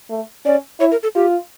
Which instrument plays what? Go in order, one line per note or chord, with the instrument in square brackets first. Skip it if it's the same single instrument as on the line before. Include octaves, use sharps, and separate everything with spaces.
[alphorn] A3
[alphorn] C#4 [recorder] D5
[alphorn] E4 [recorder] C#5
[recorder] A#4
A4
[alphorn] F4 [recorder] G4